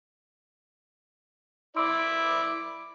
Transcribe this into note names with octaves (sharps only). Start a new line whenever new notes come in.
E4 D5 C6 E6 D7